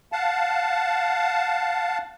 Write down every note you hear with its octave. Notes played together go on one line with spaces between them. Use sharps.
F5 F#5 A5